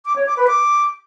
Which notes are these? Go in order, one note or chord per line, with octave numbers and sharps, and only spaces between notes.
D6
C#5
D6
B4
D6